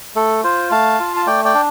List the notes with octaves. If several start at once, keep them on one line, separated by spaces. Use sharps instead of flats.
A3 A4
F4 C5
A3 F5 A5
F4
A5
A3 D5 G5
D5 G5
D4